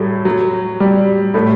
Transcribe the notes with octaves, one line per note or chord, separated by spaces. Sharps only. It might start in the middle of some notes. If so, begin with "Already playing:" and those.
Already playing: A2 F#3 G3 A3
F#3
G3
A2 A3